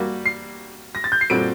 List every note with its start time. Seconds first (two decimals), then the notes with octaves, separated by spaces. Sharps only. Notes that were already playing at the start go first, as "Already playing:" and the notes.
Already playing: G3 A#3 F#4
0.26 C7
0.95 A#6
1.04 A6
1.12 G6
1.21 C7
1.30 A#2 G3 C4 F#4 A4 D7